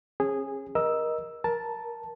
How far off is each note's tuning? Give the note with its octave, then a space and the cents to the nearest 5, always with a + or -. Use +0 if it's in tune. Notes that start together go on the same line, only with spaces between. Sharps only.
C#4 -35 G#4 -15
A#4 +25 D#5 +0 E6 +0
A#4 +15 A5 +0